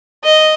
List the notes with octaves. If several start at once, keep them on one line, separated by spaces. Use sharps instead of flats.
D#5